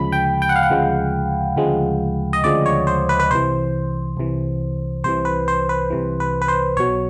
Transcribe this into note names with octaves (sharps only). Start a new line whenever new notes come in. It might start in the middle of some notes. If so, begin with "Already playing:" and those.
Already playing: D2 C#3 F3 G#3 B5
G5
G5
F#5
F5
F#5
D2 C#3 F3 G#3
D2 C#3 F3 G#3
D#5
D2 C#3 F3 G#3 D5
C#5
C5
B4
B4
C2 C3 E3 C5
C2 C3 E3
C2 C3 E3 C5
B4
C5
B4
C2 C3 E3
B4
B4
C5
B1 B2 F#3 C#5